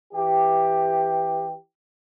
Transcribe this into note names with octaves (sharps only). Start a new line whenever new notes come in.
E3 G4